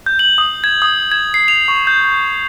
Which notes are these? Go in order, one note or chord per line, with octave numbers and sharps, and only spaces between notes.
G6
F#7
D#6
G#6
D#6
G#6
C7
F7
C#6
G6